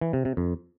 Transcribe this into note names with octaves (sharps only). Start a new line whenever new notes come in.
E3
C3
C3
F2